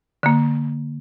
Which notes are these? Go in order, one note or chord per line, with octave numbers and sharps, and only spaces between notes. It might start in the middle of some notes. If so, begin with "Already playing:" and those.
D3 A#3